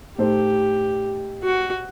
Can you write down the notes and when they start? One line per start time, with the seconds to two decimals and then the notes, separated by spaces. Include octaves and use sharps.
0.18 A2 A3 D#4 G4 A4 C5
1.43 F#4